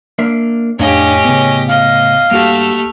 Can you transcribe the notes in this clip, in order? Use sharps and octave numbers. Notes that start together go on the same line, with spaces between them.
A#3 D4 E5
F2 A2 C#4 D4 G4 D#5 F5
C#3 B3
D#5 F5
G2 A3 A#3 F#4 G4 F6